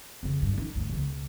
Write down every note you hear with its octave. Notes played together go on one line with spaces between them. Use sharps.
F2 C#3
G2 D3
F#2 D#4
D2 G2
C#2 B2